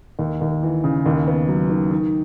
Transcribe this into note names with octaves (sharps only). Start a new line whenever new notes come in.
D#2
D#2
E3
C#3
D#2
B3
F#3
D#3
D#3